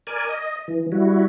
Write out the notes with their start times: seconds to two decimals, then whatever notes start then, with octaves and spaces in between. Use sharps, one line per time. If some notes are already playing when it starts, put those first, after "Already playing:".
0.07 A#4 D5 G#5
0.29 D#5
0.68 E3
0.92 G3 E4 F#4